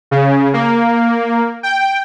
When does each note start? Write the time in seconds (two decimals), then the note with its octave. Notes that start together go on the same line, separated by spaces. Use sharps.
0.11 C#3
0.53 A#3
1.63 G5